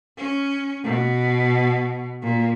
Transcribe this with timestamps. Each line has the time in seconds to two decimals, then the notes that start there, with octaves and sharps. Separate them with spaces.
0.17 C#4
0.84 B2
2.22 A#2